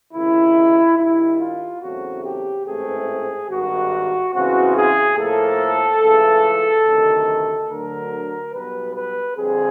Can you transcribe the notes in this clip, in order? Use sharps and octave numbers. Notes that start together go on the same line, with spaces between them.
C#2 C3 D#3 E4
G2 D#3 G3 E4
F4
E2 C#3 F#3 A3 C4 F#4
G4
A1 G#2 E3 A3 C4 G#4
G#1 G2 D#3 F#4
E2 C#3 E3 G#3 C4 F#4
G#4
A2 F3 A#3 A4
C#2 C#3 E3 A3
D2 C3 D#3 F#3
D2 D3 F#3 A#4
B1 B2 G3 B3 B4
B4
F2 D3 G3 C4 G#4